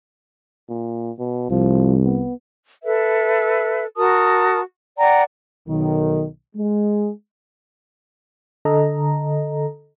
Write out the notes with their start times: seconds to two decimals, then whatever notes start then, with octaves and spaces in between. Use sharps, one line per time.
0.69 A#2
1.19 B2
1.50 C2 F3
2.04 B3
2.84 A4 B4 E5
3.96 F#4 A#4 A5 D#6
4.98 D5 F#5 G5 A#5
5.68 B1 D#3
6.56 G#3
8.65 D3 A4 D#5 A#5